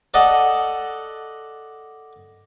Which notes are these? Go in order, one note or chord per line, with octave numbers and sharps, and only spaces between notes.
A4 D5 D#5 F#5